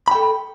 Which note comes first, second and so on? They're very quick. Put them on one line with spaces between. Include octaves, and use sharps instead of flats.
B5 G5 A4